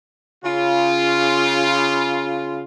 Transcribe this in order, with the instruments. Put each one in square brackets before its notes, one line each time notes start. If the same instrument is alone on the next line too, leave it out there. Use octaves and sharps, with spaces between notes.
[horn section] C#3 F4